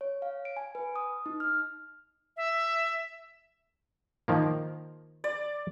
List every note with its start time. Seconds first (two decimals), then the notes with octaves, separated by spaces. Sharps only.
0.01 C#5
0.22 F5
0.45 D7
0.57 G#5
0.75 B4
0.96 D#6
1.26 D#4
1.40 F6
2.37 E5
4.28 D#3 F3 A#3
5.24 D5